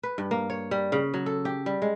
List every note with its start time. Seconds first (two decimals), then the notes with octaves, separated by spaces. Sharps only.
0.03 B4
0.18 G2
0.31 A#3
0.50 C#5
0.71 G3
0.92 C#3
1.14 F#3
1.26 A4
1.45 G4
1.66 G3
1.82 G#3